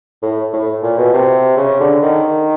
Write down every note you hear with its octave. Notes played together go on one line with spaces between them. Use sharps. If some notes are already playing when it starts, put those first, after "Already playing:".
A2
A2
A#2
B2
C3
C#3
D3
D#3